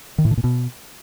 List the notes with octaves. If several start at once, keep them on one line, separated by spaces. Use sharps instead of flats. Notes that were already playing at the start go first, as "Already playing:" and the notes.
D#3
A2
D3
A#2
B2